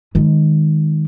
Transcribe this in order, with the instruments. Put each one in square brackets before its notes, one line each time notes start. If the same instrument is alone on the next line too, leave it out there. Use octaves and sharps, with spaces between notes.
[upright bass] D#3 G#3